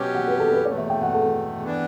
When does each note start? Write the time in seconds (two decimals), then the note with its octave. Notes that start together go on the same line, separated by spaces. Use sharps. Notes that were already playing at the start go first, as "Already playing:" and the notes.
Already playing: B2 F#3 C#4 G4
0.15 F#5
0.27 B4
0.40 A4
0.52 B4
0.65 E2 B2 A3 C#5
0.78 E5
0.90 G5
1.02 F#5
1.14 A4
1.63 E3 B3 D4